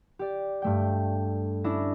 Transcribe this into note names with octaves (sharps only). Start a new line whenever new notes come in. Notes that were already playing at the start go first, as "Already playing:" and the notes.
G4 D5
G2 A3 G5
C#4 D4 E4 A#6